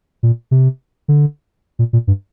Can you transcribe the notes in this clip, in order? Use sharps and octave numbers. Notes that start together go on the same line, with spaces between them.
A#2
C3
D3
A#2
A#2
G2